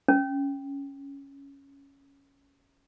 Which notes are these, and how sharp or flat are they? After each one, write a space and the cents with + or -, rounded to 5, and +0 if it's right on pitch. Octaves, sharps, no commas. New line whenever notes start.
C#4 +5